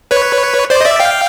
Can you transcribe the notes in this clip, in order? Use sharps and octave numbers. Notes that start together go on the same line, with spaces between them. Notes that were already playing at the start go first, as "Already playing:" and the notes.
B4 C#5
C5 D5
D#5
D5 E5
F5 G5